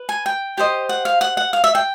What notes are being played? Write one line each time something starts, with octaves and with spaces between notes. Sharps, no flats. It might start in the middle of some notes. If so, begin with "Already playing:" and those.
Already playing: B4
G#5
G5
G4 C5 D#5
F#5
F5
F#5
F#5
F5
E5
G5